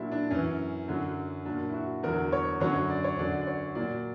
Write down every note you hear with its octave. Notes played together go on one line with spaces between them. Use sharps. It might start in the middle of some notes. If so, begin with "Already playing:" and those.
Already playing: A#2 F#3 D4 E4
D4
F#2 E3 C#4
F#2 D3 F#3
A#2 F#3 D4
E4
F#4
E2 D3 F#3 A#4
C#5
F#2 D3 F#3 C#5
D5
C#5
F#2 D3 F#3 D5
D5
C#5
A#2 F#3 D5